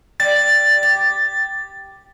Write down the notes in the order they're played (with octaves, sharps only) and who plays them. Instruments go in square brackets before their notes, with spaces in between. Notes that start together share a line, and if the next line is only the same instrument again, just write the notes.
[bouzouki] G3 [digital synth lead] A6
[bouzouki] G4